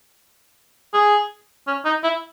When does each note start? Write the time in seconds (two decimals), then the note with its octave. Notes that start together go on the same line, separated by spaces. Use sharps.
0.94 G#4
1.67 C#4
1.85 D#4
2.04 E4